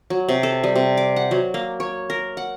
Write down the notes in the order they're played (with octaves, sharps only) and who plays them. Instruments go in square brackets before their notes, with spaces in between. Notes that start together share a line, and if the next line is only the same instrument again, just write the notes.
[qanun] F#3
C3
A4
G3
C3
D6
F#5
F#3
A#3
C#5
A#4
F#5